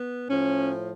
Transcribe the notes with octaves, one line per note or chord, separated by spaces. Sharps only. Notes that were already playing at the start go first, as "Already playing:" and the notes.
Already playing: B3
A2 F3 C#4